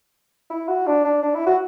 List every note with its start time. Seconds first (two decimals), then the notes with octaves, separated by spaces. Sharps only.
0.50 E4
0.68 F#4
0.87 D4
1.04 D4
1.23 D4
1.34 E4
1.46 F#4